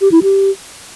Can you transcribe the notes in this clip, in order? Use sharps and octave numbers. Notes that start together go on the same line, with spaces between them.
G4
E4
G4